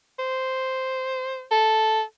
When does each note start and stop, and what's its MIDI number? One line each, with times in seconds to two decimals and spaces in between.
0.19 1.46 72
1.51 2.02 69